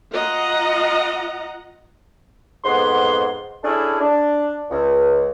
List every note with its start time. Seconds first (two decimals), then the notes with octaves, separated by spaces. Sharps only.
0.13 F4 D#5 F#5 A#5
2.64 F2 G#2 B3 F#5 C6
3.64 C#4 D4 E4 G#4 A4
4.00 D4
4.70 C#2